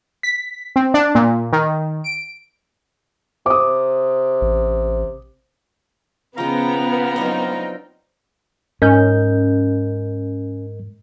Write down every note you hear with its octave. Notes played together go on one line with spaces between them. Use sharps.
B6
C4
D4
A#2
D#3
D7
C3 D6 D#6
A1
C#3 F3 G#3 B3 F5 G5 A#5
F#3 C4 D4 D#4
G#2 C#4 A#4 D#5 G6